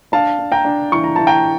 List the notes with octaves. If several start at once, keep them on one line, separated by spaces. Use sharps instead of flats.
D4 F5 A5
D4
G5 A#5
D4
E3 C#6
A#5
E3 A5
G5 A#5